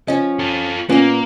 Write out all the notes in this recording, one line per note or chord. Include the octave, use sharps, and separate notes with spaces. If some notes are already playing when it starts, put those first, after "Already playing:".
F3 C#4 D#5
F4 A4
A#2 A#3 B3 C#4 F4